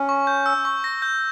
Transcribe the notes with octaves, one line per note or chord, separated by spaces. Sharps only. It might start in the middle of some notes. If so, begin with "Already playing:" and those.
Already playing: C#4
C#6
G6
E6
C#6
A#6
G6